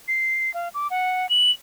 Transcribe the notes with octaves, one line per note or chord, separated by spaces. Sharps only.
C7
F5
D6
F#5
F#7